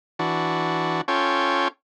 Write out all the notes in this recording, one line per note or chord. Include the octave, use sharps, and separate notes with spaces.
E3 D4 F#4
C#4 F4 A4 C#5 G5